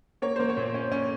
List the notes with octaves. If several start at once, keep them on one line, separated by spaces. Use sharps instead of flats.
A#3 C#5
A#3 C5
C#5
A#2
C#4
C#4